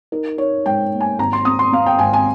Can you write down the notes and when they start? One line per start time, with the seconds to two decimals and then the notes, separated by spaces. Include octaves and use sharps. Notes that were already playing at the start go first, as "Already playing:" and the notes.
0.12 D#4 A#4
0.38 D#4 C#5
0.66 G#2 G5
0.93 A#3
1.01 G#5
1.19 G#1 A#5
1.33 C6
1.45 C4 D#6
1.59 C6
1.72 C4 F5
1.86 G5
1.99 G#1 G#5
2.13 G#5